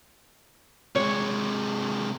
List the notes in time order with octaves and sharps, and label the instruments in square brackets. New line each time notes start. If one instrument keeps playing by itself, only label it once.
[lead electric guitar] C3 G#3 [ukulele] C#5